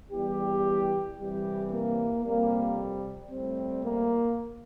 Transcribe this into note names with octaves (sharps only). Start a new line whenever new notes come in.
E2 E3 G3 G4
C2 C3 E3 G3 G4
A#3
F2 C3 G3 A#3
A2 G3 C4
A#3